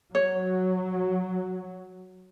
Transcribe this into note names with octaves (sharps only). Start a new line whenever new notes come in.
F#3 C#5